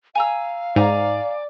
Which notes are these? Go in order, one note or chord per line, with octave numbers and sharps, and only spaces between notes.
F5 G#5 A#5 E6
G#2 D5 G#5 A#5